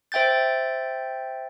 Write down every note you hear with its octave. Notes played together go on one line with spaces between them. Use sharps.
C5 E5 G5 G6 A6